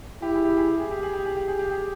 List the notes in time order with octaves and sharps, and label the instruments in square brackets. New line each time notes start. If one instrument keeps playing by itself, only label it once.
[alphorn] E4 [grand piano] G4
[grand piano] G#4
G4
G#4
G4
G#4
G4
G#4
G4
G#4
G4
G#4
G4
G#4